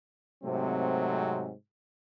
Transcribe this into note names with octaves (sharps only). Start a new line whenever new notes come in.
G#2 C3 F#3 A3 C4